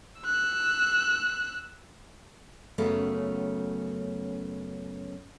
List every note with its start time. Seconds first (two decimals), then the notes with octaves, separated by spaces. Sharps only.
0.21 E6 F#6
2.78 F#2 C#3 A3 B3 C#4